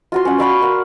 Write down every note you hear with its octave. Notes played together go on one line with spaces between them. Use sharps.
F4 F#4 C6
C#4 F#5
D5 F5 B5 C#6
A#4 F#5